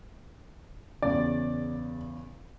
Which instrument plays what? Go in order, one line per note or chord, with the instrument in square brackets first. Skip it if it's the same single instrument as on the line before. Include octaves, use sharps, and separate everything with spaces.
[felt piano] E2 C#3 [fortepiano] D5